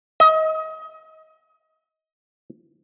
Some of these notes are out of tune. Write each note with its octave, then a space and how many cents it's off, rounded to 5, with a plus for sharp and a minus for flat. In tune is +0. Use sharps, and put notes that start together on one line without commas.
D#5 +30